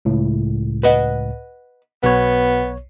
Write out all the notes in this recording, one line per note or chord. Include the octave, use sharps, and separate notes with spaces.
C#2 A2
B4 D#5 F#5
B1 B2 B3 C#5